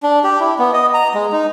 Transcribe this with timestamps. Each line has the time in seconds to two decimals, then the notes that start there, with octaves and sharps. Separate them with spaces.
0.03 D4
0.24 G4
0.40 E4
0.59 B3
0.73 D#5
0.94 A#5
1.14 G#3
1.32 D#4